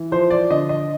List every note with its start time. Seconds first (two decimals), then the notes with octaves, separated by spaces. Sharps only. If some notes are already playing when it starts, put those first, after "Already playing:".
Already playing: E3
0.12 F3 C5
0.31 D5
0.50 D3 D#5
0.69 D#5